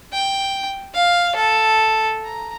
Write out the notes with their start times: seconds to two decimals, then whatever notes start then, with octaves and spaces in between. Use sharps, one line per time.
0.13 G5
0.94 F5
1.35 A4
2.24 A#5